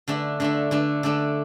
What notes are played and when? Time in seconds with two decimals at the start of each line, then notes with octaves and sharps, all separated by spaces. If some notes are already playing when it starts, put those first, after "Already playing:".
0.08 D3 A3 D4
0.40 D3 A3 D4
0.71 D3 A3 D4
1.03 D3 A3 D4